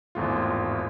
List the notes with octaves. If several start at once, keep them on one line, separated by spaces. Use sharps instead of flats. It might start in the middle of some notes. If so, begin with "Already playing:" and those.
G#1 E2 A2 F4